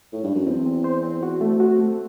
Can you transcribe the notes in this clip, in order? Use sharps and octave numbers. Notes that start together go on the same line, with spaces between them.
A2
G2
F#2
E2 C4
C4
C5
C4
F#4
A3
F#4
A3